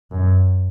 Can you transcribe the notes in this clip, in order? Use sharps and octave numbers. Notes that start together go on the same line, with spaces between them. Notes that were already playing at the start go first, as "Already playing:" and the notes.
F#2